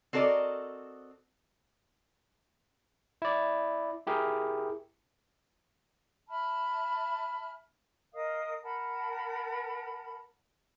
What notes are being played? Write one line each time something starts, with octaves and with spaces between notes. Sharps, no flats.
C4 F#4 A4 A#4 D5 D#5
E4 D5
E4 G4 G#4 A#4
E5 A5 B5 F6
A#4 D#5 F5 D#6
A#4 F#5 A5 B5